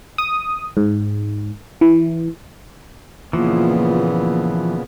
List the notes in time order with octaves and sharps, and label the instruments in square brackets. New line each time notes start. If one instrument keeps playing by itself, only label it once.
[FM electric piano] D#6
G#2
E3
[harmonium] A#2 C#3 B3 [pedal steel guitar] E3 F3 [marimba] A#3 F4